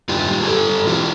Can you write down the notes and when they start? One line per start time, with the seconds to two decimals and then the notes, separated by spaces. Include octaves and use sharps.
0.09 G2 F4 G4
0.28 G3
0.43 G#4
0.48 G2 G4 A4
0.68 G2
0.87 E3 F4 G4